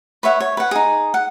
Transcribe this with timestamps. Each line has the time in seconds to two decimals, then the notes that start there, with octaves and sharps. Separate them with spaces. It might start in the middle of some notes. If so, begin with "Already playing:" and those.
0.23 B4 C#5 E5 F#5
0.40 C#5
0.57 B4 F#5
0.71 D#4 G#4
1.14 F#5